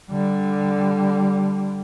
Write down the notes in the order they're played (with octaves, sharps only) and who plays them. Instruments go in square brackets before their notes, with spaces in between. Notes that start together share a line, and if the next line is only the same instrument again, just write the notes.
[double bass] D3 G3